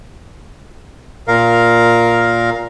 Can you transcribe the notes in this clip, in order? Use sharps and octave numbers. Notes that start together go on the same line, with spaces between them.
A#2 A#4 F5